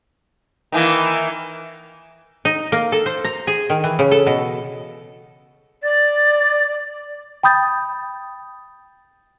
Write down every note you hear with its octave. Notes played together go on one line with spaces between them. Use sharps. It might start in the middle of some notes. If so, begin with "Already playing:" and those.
D#3 E3 A#3
D#4
A#3
A4
C5
A#5
G#4
D#3
E3
C#3
A4
B2
D5 A6
G5 B5 D#6 G6 A6